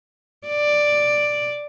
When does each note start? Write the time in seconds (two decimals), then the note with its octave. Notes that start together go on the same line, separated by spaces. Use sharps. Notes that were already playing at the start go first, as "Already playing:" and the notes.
0.47 D5